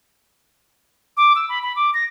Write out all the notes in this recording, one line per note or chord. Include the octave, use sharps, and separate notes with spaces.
D6
E6
B5
B5
D6
A#6